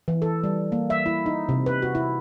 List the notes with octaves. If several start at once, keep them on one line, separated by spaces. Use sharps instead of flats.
E3
A4
G3
A#3
E5
E4
D#4
C3
B4
F#4
E4